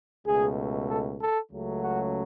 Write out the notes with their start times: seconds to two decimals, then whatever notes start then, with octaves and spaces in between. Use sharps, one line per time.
0.25 C#2 B2 A3 G#4
0.88 A4
1.20 A4
1.50 C#2 C#3 F#3 A3
1.81 F#4